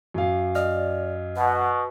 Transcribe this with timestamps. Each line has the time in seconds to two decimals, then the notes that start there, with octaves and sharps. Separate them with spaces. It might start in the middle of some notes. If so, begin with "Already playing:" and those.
0.14 F#2 F5
0.55 D5 D#5 F6
1.36 B2 F#5